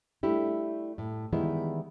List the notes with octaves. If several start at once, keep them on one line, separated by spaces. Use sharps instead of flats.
G3 A3 D4 E4 G4
A2
D#3 E3 G3 G#3 B3 E4